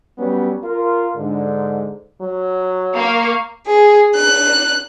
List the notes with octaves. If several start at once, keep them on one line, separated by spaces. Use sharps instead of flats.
F#3 G3 B3 C#4
F4 A#4
G#2 D3
F#3
A#3 F5 C#6
G#4
F#6